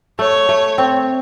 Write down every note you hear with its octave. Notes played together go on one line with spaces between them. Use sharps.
A3 C#5
A3
C4